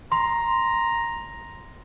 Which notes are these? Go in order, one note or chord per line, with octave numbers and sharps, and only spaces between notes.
A#5 C6